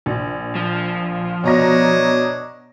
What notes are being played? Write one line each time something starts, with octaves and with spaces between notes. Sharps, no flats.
A#1
F3
B2 D4 C#5 D#5 A#5 A#6